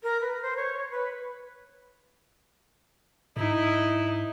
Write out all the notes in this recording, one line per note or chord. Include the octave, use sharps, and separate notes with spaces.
A#4
B4
C5
C#5
B4
G#2 D#4 E4